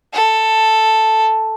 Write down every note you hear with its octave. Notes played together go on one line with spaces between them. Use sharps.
A4